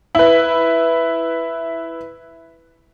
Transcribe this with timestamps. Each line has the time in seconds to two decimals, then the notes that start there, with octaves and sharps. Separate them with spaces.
0.15 E4 B4